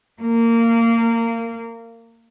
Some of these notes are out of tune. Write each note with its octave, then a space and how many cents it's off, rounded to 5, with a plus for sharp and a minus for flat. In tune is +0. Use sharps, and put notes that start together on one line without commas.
A#3 -20